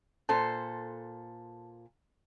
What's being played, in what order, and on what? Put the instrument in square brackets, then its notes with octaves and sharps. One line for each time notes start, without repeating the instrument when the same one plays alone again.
[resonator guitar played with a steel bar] A#2 A4 C5 [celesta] A5